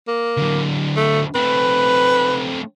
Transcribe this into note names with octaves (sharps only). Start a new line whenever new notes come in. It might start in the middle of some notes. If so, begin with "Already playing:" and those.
A#3
D3 F#3
A3
A3 C4 B4